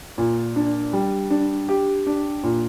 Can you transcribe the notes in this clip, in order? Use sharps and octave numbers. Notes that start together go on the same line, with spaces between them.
A#2
D4
G3
D4
G4
D4
A#2